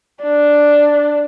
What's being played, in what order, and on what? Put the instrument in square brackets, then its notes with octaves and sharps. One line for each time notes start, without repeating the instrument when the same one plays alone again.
[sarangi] D4